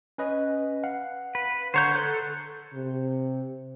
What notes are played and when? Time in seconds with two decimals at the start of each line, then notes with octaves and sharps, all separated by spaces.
0.18 C#4 B4 D#5
0.84 F5 F#5
1.35 B4
1.74 D3 C5 C#5 F#5 A#5 G6
1.95 A4 C6 F#6 G6
2.74 C3